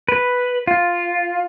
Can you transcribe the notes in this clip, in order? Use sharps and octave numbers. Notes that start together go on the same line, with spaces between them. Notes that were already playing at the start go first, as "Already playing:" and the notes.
B4
F4